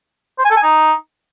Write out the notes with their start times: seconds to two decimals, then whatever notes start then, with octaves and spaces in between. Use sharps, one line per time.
0.38 C5
0.45 G#5
0.51 A4
0.57 G#5
0.63 D#4